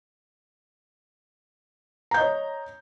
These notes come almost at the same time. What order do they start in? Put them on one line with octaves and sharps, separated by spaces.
A#5 G6 D#5 C#5